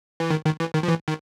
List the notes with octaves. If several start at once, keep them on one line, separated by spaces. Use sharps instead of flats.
E3
D#3
D#3
E3
D#3
F3
E3
D#3